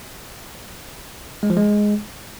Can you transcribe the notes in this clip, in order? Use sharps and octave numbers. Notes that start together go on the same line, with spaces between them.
G#3
F3
G#3